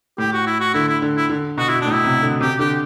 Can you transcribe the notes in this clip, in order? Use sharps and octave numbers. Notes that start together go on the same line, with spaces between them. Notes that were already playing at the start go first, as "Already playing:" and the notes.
A2 G4
F#4
E4
F#4
D3 E4
E4
D3
E4
D3
B2 F#4
E4
A2 D4
E4
C3
D3
C3 G4
D3 G4